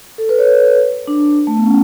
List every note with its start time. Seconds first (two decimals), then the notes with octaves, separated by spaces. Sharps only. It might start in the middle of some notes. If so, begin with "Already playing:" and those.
0.18 A4
0.29 B4
0.39 C#5
1.08 D4
1.47 A3
1.57 B3
1.66 C#4